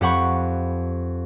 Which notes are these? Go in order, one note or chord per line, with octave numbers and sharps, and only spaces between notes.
F2 G4 F#5 B5 C#6